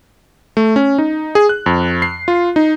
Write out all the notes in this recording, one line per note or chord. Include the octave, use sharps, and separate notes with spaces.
A3
C#4
D#4
G#4
F#6
F2
C7
F4
D#4